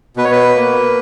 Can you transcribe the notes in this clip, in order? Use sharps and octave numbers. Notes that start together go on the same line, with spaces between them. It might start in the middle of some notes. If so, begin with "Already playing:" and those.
B2 B4
C#5
B4
A#3